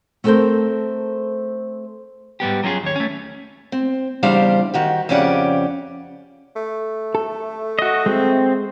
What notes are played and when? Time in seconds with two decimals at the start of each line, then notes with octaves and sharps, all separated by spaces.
0.24 A3 B3 C4 A4 A#4 C5
2.40 G#2 G3 B3 G4
2.64 F#3 C#4 F4 F#4 G#4
2.83 D#2 C#5
2.96 A3 C#4
3.72 C4
4.23 E2 C#3 G3 D4 C5 F5
4.74 D#3 F#4 G4
5.09 F2 C#3 C#4 G4 D5 F#5
6.56 A3
7.15 A4
7.79 F#4 D#5
8.06 G#3 C4